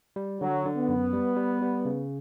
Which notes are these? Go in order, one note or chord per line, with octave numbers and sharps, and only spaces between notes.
G3
D3 F#3
D3
B3
F#2
G3
G3
G3
C#3